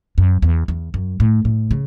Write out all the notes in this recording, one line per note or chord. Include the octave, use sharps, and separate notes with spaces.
F#2
E2
E2
F#2
A2
A2
C#3